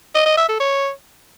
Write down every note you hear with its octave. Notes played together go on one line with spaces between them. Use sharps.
D#5
D#5
E5
A4
C#5